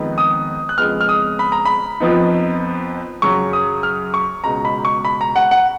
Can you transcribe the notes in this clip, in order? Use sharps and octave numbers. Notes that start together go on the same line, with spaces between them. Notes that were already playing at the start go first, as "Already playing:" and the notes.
Already playing: F2 D#3 G#3 B3 D#4
D#6
F#6
F2 C#3 G#3 B3 F6
F6
D#6
B5
A#5
B5
F2 F3 B3 D#4
F#2 C#3 F#3 C#6
D#6
F6
C#6
C#2 B2 G#3 A#5
B5
C#6
B5
A#5
F#5
F#5